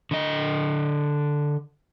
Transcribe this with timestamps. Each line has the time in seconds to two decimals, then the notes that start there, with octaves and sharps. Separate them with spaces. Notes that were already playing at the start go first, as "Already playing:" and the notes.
0.11 D3 D#5